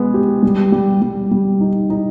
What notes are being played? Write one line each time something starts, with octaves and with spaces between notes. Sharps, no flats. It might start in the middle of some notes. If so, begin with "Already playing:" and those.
Already playing: G#3 B3
G4
G3
G3
G3
G3
D#4
D#4